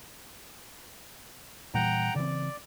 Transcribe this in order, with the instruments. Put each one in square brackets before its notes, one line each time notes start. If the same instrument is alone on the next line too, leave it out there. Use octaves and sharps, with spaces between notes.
[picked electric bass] A#2 E3 G3 [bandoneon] F#5 G5 A#5
[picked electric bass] C#3 E3 C4 [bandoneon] D5